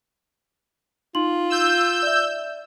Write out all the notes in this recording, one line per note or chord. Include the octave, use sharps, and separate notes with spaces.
D#4 F4 C6 F#7
E6 G6
D5 E5